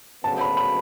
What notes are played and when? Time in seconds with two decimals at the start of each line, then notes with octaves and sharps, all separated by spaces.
0.24 D2 C#3 F#3 B3 A5
0.41 B5
0.57 B5